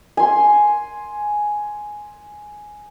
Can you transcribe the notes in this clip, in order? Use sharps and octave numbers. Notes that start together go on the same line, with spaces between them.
G#5 C6